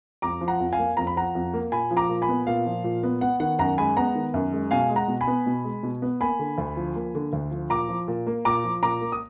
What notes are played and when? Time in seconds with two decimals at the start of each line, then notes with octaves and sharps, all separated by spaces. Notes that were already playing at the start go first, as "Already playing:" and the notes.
0.22 F2 A#5 D6
0.41 F3
0.48 F#5 A#5
0.60 F2
0.73 F5 G#5
0.79 A#3
0.97 F2 A#5
1.07 B5
1.16 F3 F#5 A#5
1.35 F2
1.54 A#3
1.72 A#2 G#5 B5
1.91 F3
1.97 A#5 D6
2.09 A#2
2.22 G#5 B5
2.29 B3
2.47 A#2 F5
2.66 F3
2.84 A#2
3.03 B3
3.21 B3 F#5
3.40 D#3 F#5
3.59 F#2 F#5 A#5
3.78 G#3 G#5 B5
3.97 B3 F#5 A#5
4.15 D#3
4.34 F#2
4.53 G#3
4.71 B2 F5 G#5
4.89 G#3
4.96 F#5 A#5
5.08 B2
5.21 G#5 B5
5.27 B3
5.46 B2
5.64 G#3
5.83 B2
6.02 B3
6.21 A#3 G#5 B5
6.39 D3
6.58 D2
6.77 F3
6.96 A#3
7.15 D3
7.33 D2
7.51 F3
7.70 A#2 A#5 D6
7.89 F3
8.08 A#2
8.27 A#3
8.45 A#2 A#5 D6
8.64 F3
8.83 A#2 A#5 D6
9.01 A#3
9.12 D#6